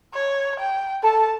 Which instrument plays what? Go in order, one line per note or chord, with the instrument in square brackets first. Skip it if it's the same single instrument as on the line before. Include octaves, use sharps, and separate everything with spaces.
[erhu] C#5
G5
[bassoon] A4 [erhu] A5